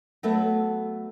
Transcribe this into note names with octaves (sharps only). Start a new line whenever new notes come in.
F#3 A3 B3 A4 E5